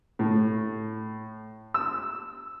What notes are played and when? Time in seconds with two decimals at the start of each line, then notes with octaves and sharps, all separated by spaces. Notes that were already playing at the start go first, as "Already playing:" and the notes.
0.19 A2
1.74 E6